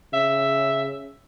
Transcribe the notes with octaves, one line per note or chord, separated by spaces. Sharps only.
C#3 E5